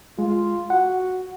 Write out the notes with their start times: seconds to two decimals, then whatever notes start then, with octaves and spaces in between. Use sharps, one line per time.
0.19 G#3 F4
0.70 F#4 F#5